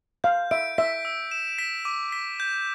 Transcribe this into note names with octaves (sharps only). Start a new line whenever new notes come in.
F5 G6
E5 D7
E5 B6
E6
E7
B6
D6
B6
G6